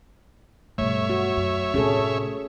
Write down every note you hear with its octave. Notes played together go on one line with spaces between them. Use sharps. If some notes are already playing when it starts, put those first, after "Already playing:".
G2 B2 A3 C#5 E5
F#4
F#2
A2 C3 C#4 G#4 A4